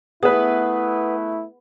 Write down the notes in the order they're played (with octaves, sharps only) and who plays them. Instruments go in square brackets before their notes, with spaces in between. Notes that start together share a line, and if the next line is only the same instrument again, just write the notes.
[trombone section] A3 E4 [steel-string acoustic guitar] B3 [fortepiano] G#4 B4